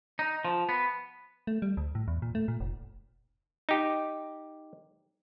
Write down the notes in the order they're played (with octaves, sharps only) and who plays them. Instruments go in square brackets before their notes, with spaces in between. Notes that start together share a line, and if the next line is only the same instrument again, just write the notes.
[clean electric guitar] D#4
F3
B3
[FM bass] A3
G3
D2
A2
E2
A#2
A3
A#2
F1
[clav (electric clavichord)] D#4 G4